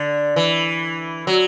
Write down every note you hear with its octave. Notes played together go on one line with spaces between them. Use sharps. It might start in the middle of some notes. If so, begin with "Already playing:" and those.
Already playing: D3
E3
F#3